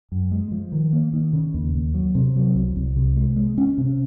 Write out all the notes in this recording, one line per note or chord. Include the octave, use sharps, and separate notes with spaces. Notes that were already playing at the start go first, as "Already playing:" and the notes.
F#2
G#3
F3
D#3
A#3
D#3
C#3
D#2
D#2
F#3
C3
F#3
C2
C2
C3
G#3
G#3
C#4
C3